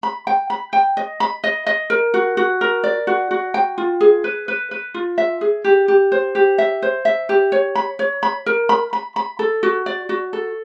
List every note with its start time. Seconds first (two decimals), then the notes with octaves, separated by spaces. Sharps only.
0.03 B5
0.27 G5
0.50 B5
0.73 G5
0.97 D#5
1.20 B5
1.44 D#5
1.66 D#5
1.90 A#4
2.14 F#4
2.37 F#4
2.61 A#4
2.84 D5
3.07 F#4
3.31 F#4
3.54 G5
3.78 F4
4.01 G#4
4.24 B4
4.48 B4
4.71 B4
4.94 F4
5.18 E5
5.41 G#4
5.64 G4
5.88 G4
6.12 C5
6.35 G4
6.58 E5
6.82 C5
7.05 E5
7.29 G4
7.52 C#5
7.75 B5
7.99 C#5
8.23 B5
8.46 A#4
8.69 B5
8.93 B5
9.16 B5
9.39 A4
9.63 F#4
9.86 D5
10.09 F#4
10.33 A4